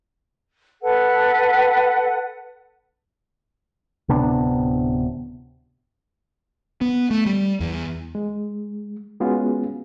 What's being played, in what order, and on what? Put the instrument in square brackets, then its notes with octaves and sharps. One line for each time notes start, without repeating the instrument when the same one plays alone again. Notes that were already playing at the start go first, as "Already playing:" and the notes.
[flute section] A4 B4 F#5
[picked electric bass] D1 C3 B3 D4
B3
A3
G3
E2
[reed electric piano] G#3
G#3 B3 C#4 F4 F#4 G#4